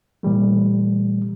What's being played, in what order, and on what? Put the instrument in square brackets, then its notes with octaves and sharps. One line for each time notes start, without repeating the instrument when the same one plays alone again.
[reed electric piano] A#2 E3 G3 A3